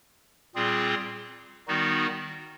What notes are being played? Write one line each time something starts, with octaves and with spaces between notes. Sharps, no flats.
A#2 G3 C4 F4 G#4
D#3 G3 B3 D#4 F#4